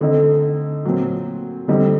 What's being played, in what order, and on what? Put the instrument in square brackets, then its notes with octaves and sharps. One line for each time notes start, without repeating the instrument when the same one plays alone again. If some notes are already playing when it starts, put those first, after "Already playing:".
[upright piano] D3 A3 C4 D#4
A#2 F#3 C4
D3 G3 C4 D#4